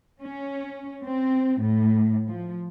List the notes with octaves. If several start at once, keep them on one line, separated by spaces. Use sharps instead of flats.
C#4
C4
A2
F3